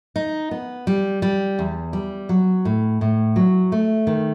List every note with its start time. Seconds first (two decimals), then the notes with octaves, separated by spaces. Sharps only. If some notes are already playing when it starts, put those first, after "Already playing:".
0.16 D#4
0.51 B3
0.87 G3
1.22 G3
1.59 E2
1.93 G3
2.29 F#3
2.65 A2
3.01 A2
3.36 F#3
3.72 A3
4.07 D#3